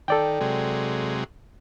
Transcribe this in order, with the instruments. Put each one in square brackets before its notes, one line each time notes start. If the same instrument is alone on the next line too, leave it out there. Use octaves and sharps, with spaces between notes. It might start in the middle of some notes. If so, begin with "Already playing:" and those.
[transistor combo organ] D#3 [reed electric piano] A4 D5 G5
[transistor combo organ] C3 F#3 G#3